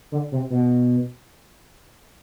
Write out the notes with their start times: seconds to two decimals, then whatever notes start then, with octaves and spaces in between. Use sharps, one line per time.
0.12 D3
0.32 C3
0.50 B2